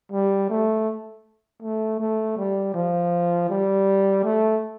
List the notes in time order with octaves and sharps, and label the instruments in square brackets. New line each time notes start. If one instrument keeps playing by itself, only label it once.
[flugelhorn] G3
A3
A3
A3
G3
F3
G3
A3